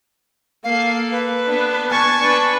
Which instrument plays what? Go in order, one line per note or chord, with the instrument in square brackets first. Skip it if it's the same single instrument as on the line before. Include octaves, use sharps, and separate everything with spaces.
[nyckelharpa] A#3 A4 [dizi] F5
[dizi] B4
[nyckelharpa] B3 D4
[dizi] G#5 [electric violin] A5 C#6
[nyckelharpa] D4 B4